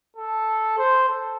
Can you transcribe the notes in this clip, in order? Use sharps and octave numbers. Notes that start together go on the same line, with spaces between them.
A4
C5
A4